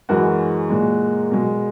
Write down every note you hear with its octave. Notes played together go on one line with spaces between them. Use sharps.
F#2 E3 G#3 F#4 A#4
A#2 G#3
B2 G#3